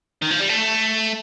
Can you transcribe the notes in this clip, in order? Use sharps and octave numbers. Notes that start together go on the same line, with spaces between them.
D#3
F3
G3
A3